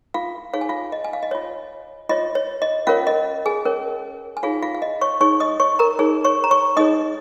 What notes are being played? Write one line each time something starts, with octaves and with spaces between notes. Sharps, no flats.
F4 F5
D#4 G#4 C#5 F5
G#5
F4 F5
D#5
G#5
F5
D#5
F4 C#5
F4 C#5 D#5
C#5
D#5
C#4 F4 A#4 C#5 F5
D#5
G#4 G#5
C#4 A#4 C#5
G#5
D#4 F4 G#4 C#5 F5
F4 F5
F5
D#5
C#5 C#6
D#4 G#4 C#5 C#6
D#5 D#6
C#5 C#6
A#4 A#5
D#4 G#4 C#5
C#5 C#6
A#5
C#5 C#6
D#4 G#4 C#5 D#5 D#6